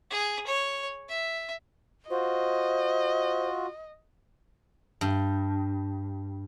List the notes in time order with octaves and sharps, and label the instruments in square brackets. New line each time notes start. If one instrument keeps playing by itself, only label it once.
[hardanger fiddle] G#4
C#5
E5
[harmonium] F4 F#4 [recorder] C5 [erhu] D#5
[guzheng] G2